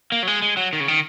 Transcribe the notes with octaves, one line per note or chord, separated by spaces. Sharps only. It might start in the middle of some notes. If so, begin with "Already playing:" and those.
A#3
F#3
G#3
G#3
F#3
D#3
C#3
D#3